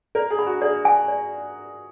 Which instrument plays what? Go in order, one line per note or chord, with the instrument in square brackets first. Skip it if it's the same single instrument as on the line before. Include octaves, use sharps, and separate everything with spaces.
[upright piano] A#4 [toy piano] D5
[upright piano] G#4
[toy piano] B5
[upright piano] F#4
[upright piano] G#4 [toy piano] D5
[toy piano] G#5
D5